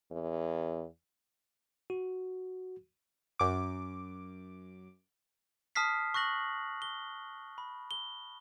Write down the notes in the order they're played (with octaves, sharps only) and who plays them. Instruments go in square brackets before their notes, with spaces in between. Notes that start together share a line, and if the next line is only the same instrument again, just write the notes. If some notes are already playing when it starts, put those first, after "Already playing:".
[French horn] E2
[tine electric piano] F#4
[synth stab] F#2 D6
[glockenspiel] A5 D#6 F6 B6 C7
C#6 F#6 A#6 F#7
G7
B5
G7